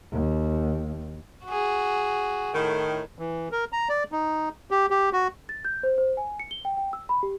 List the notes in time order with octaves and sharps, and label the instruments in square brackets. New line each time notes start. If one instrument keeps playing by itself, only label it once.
[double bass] D#2
[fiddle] F#4 G#4
[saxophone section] A2 D#3
[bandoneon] E3
A#4
A#5
D5
D#4
G4
G4
F#4
[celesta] A6
G6
C5
C5
G#5
C#7
G7
G5
G5
E6
B5
G4